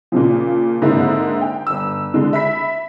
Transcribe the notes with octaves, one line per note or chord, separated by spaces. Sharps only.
A#2 C#3 F3
G#2 D3 A#3 C4 E4
G5
G1 E6
D3 G#3
E5 B5 B6